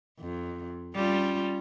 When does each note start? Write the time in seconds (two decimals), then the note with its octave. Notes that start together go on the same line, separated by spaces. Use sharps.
0.20 F2
0.95 G3 C#4 F4